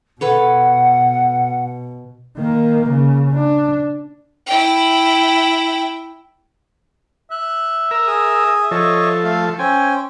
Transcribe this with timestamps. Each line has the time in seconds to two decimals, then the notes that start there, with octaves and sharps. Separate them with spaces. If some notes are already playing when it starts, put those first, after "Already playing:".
0.21 B2 A4 B4 C#5 F#5
2.37 D#3 A#3
2.89 C#3
3.34 D4
4.47 E4 G5
7.31 E5 F#6
7.91 A#4 E6
8.07 G#4 D#6
8.71 F3 A4 C#5 D#5
9.24 A3 F5
9.59 C#4 C5 G5 G#5